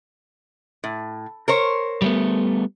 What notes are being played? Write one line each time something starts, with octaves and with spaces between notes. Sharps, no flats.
A2
A#4 C5 C#5
G3 A3 B3